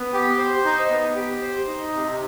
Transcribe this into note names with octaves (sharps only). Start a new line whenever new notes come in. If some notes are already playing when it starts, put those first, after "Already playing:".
Already playing: B3
G4
C5
D#4
B3
G4
C5
D#4
C3